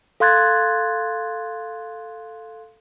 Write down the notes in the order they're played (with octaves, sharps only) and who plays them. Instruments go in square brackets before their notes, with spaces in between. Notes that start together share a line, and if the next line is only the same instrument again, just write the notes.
[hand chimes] A4 F5 C6 F#6 G#6 A6